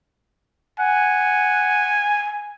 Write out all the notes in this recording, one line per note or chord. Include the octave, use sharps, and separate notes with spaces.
F#5 G#5